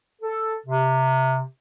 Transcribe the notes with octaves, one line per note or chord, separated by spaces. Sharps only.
A4
C3